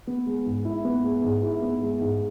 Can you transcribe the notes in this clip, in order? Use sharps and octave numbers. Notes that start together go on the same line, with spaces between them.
B3
G#3
G#2
E4
B3
G#3
G#2
E4
B3
G#3
G#2